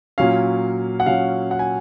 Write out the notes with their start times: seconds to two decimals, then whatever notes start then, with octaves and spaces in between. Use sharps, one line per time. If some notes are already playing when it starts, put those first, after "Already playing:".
0.18 A#2 F#3 C#4 F5
1.00 F#5
1.06 A#2 F#3 C#4 F5
1.51 F#5
1.59 G#5